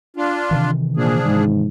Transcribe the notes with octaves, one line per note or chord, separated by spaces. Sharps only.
D4 F4
C3 D#3 E3
A#2 F3 D4 G#4
G#2